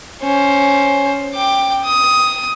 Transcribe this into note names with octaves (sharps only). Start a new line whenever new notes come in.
C#4 C5
G5 D6
D#6